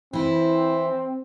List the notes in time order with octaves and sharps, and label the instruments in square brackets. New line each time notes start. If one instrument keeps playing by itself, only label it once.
[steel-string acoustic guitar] E3 E4 [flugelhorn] C4